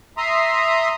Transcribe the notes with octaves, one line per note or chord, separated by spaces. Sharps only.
E5 A#5 C6 D#6